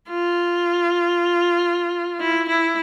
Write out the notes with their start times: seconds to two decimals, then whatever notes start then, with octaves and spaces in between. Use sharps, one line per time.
0.10 F4
2.20 E4
2.48 E4